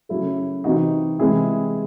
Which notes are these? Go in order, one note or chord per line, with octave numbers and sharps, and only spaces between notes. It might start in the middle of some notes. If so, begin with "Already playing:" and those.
C#3 F#3 A3 E4
C3 E3 C4 D#4 F#4
C3 E3 G#3 C4 E4 G#4